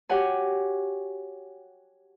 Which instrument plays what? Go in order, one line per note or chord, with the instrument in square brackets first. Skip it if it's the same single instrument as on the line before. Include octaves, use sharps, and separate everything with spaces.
[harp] F#4 G4 C#5 F#5 G#5